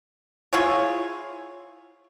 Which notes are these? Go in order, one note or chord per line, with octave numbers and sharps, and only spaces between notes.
E4 F4 G#4 C#5